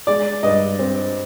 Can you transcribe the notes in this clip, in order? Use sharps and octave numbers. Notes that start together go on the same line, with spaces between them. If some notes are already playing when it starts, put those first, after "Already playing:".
G#3 D5
G2 D#5
C4